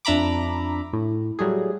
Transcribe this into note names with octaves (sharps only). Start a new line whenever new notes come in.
F2 D4 E5 A#5 B5 D6
A2
F#3 G3 A3 G#4